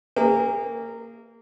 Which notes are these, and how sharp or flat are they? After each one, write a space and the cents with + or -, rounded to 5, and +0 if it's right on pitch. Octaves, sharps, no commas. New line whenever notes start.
A#3 -20 G#4 -45